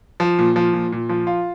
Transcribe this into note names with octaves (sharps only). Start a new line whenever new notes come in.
F3
A#2
F3
A#2
A#2
F3
F4